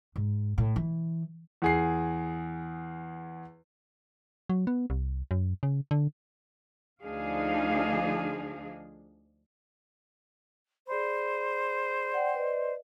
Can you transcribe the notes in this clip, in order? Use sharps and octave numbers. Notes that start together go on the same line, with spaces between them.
G#2
A2
E3
E2 G#4 C7
F#3
B3
C2
F#2
C#3
D3
D2 F3 D4 D#4 G#4 F5
G#4 C5 D5 B5
D5 F#5 G5
B4 D5 D#5